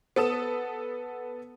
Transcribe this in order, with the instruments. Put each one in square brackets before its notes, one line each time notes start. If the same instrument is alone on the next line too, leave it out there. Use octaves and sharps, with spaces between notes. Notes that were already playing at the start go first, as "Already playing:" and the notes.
[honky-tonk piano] B3 A4 D#6 E7